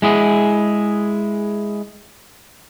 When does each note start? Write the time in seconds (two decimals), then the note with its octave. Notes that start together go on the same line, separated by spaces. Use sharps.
0.02 G#3 E4 G#4